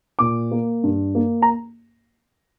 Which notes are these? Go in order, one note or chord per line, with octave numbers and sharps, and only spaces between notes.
A#2 D6
A#3
G2
A#3
A#5